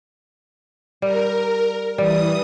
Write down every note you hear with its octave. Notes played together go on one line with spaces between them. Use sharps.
G3 A#4
E3 G3 D#6